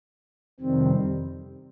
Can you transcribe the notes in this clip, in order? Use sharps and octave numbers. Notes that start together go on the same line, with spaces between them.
F2 C3 D#3 G3 C4